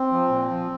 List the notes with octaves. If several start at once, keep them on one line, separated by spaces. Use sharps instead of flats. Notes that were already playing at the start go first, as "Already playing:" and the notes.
Already playing: C4
F3
A#2
F3